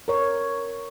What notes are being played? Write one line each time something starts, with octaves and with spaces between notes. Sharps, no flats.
A#4 C#5